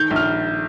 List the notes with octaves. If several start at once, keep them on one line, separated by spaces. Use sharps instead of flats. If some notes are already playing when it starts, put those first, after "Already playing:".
Already playing: D#3 G6
A#1
F6